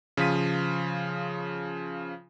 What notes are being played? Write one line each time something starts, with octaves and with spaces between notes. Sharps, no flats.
C#3 F3 F4 B6 D#7